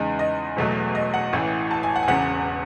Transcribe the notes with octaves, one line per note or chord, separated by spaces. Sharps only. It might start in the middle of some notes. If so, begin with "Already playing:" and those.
Already playing: E2 C#3 G#3 D#4
D#5
E1 E2 B2 F#3 A3
D#5
F#5
A1 A2 E3
A5
G#5
F#5
G#5
E1 E2 C#3 F#5